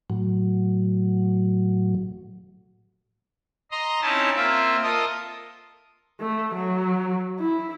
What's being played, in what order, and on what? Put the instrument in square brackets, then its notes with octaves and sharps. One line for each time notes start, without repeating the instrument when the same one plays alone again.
[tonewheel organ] A2 F#3
[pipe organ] D#5 A#5 C6
C4 C#4 D#4 E4 A5
A#3 C4 F4 E5
F4 A4 A#4 D#5 D#6
[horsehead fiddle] A3
F#3
E4